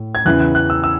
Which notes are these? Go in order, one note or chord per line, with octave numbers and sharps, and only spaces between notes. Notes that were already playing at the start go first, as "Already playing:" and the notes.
Already playing: A2
G#6
E2 C#3 E3 F#6
F#6
F#6
E6
E6